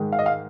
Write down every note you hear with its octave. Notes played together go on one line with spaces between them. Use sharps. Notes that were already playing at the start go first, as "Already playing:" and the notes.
Already playing: G#2 D#3 G#3
F5
D#5
F5